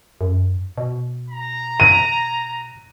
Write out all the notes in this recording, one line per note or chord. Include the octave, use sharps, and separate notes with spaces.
F#2
B2
A#5
D#7